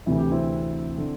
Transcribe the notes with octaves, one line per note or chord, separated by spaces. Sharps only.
D2 C3 E3 E4
G4
C4 E4
D3